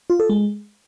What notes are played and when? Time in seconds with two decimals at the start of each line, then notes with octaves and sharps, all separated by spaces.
0.10 F4
0.20 A4
0.30 G#3